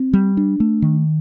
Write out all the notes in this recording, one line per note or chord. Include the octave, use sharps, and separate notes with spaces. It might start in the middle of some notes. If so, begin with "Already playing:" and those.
Already playing: C4
G3
D4
A3
D#3